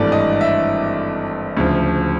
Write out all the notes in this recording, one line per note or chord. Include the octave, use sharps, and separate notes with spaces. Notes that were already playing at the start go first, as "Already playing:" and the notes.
Already playing: G#1 G2 E3 A3 D4 D5
D#5
E5
D2 C#3 F3